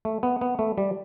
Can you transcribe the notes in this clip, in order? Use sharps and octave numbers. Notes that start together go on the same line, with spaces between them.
A3
B3
B3
A3
G3